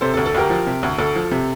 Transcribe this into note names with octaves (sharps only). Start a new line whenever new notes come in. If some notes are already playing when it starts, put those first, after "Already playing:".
C3 A4 C5
A4
D2
A4
D2 G4 A#4
F3
C3
D2
D2 A4
F3
C3